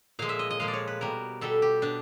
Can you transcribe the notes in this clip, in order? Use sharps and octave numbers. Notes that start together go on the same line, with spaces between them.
A#2 F3 G#3 F5
E5
D#5
D#5
A#2 F3 G#3 F5
D5
C#5
B4
B2 G3 A#4
B2 G3 A4
G4
B2 D4